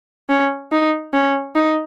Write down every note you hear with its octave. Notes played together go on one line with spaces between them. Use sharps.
C#4
D#4
C#4
D#4